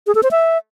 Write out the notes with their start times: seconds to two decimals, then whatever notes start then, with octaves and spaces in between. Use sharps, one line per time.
0.07 G#4
0.15 A4
0.23 C5
0.31 E5